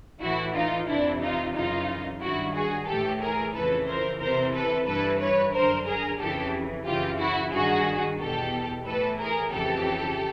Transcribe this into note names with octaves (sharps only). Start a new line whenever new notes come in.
A2 E3 E4 F#4
D#4 F4
F2 C3 E3 D4 E4
D#4 F4
F#2 C#3 E3 D#4 F4
G2 D#3 E4 F#4
F#4 G#4
A2 E3 G4 A4
G#4 A#4
F2 C#3 E3 A4 B4
A#4 C5
E2 C3 E3 A#4 C5
A4 B4
G2 E3 A4 B4
B4 C#5
F#2 D3 A#4 C5
G#4 A#4
F2 C#3 E3 G4 A4
F#2 C#3 E3 F4 G4
E4 F#4
G2 D#3 F#4 G#4
E2 B2 G4 A4
A2 E3 A4 B4
G#4 A#4
F2 C#3 E3 G4 A4